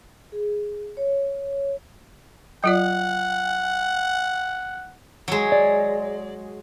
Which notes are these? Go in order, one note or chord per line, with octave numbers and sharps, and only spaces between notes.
G#4
C#5
F#3 F4 D5 F#5
F#3 G#3
D5